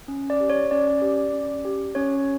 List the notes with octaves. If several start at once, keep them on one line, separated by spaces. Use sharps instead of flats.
C#4
D5
G4
C#5
C#4 D5
G4
C#4
G4
C#4 C#5